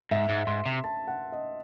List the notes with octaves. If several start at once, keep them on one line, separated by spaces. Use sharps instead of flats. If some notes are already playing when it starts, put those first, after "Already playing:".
G#2 E5
G#2
G#2 C6
C3
A5
F#5
D#5